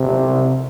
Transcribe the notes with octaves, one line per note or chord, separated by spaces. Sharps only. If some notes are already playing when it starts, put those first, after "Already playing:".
Already playing: C3